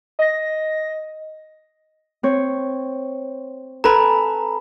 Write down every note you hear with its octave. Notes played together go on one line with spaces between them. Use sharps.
D#5 A#6
C4 C#5
A4 B4 G#5 A#5 B5